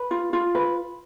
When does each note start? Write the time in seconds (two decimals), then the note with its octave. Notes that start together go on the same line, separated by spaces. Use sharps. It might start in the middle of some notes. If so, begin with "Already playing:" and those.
Already playing: B4
0.11 F4
0.33 F4
0.55 B4